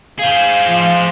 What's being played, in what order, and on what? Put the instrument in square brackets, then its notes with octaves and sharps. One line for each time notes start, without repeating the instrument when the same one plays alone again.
[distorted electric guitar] G#4 C5 [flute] F5
[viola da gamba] F3